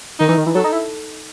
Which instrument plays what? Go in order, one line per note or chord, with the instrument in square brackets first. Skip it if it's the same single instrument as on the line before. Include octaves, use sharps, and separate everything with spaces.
[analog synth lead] D#3 [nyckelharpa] D#4
[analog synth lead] E3
D#3
E3
[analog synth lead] F#3 [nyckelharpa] A4
[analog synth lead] D#4
E4